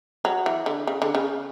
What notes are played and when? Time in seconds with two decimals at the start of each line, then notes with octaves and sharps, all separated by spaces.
0.25 F#3
0.46 E3
0.66 D3
0.87 C#3
1.02 D3
1.15 C#3